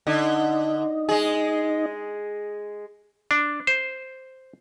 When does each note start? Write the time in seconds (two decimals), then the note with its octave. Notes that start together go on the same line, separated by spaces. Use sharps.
0.07 D3 D#4 D#5
1.09 G#3 G#4
3.31 D4
3.67 C5